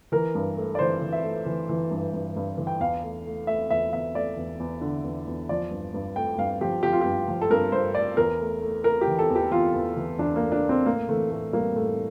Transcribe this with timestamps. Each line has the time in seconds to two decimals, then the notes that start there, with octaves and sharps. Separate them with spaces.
0.12 E3 A#4
0.35 G2
0.57 A3
0.75 D5
0.79 E3 C5
1.01 E3
1.13 E5
1.24 A3
1.46 E3
1.69 E3
1.91 G2
2.14 G2
2.36 G2
2.58 E3
2.67 G5
2.80 E2 F5
3.03 A3
3.26 A3
3.47 A3 E5
3.70 E2 E5
3.93 E2 E5
4.15 A3 D5
4.37 E2
4.60 E2
4.81 D3
5.04 E2
5.27 E2
5.49 F3 D5
5.71 G2
5.94 G2
6.16 A3 G5
6.38 G2 F5
6.61 F3 G4
6.83 F3 G4
6.93 F4
7.01 G2 G4
7.28 F3
7.41 A4
7.50 G2 A#4
7.72 G2 C5
7.95 A3 D5
8.17 E2 A#4
8.40 A3
8.62 A3
8.84 A3 A#4
9.01 G4
9.08 E3
9.19 A4
9.30 E2
9.35 G4
9.51 E2 F4
9.74 E2
9.97 E3
10.19 E2 D4
10.36 A#3
10.41 A3
10.52 D4
10.63 A3
10.69 C4
10.86 A2 A#3
11.09 E3 A3
11.30 A2 A3
11.53 G3 A#3
11.75 A2 A3